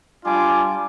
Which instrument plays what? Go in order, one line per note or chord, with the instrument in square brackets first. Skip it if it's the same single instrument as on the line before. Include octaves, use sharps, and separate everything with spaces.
[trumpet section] G3 D4 F4 G#5 D6